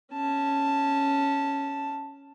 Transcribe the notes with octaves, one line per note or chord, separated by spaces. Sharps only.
C#4 A5